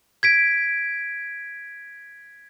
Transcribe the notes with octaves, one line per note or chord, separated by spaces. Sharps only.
G#6 B6 D7